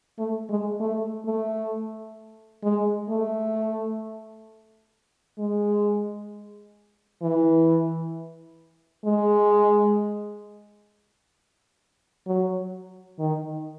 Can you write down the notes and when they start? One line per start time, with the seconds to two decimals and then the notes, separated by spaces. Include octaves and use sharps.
0.19 A3
0.49 G#3
0.80 A3
1.26 A3
2.63 G#3
3.09 A3
5.38 G#3
7.22 E3
9.05 G#3
12.27 F#3
13.19 D#3